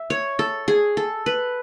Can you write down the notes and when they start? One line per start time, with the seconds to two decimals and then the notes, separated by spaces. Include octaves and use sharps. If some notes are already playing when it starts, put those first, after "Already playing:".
Already playing: E5
0.10 C#5
0.39 A4
0.68 G#4
0.97 A4
1.26 B4